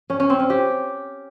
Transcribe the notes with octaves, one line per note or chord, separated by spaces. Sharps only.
C#4
C#4
C4
C#4
G4